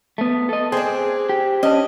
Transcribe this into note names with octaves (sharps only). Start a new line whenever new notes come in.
A3 B3
A4 D#5
C4 D4 G#4
G4
C#4 D4 D#5